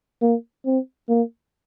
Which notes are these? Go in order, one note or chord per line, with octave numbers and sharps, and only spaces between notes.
A#3
C4
A#3